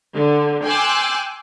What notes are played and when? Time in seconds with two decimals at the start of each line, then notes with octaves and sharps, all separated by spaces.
0.14 D3
0.64 G5 G#5 C6 D6 E6 F#6